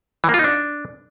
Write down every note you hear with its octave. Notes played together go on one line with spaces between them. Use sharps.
E3
A#3
F4
D#4
D4